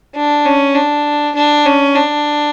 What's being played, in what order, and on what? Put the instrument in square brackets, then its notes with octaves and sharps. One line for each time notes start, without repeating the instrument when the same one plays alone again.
[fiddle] D4
C#4
D4
D4
C#4
D4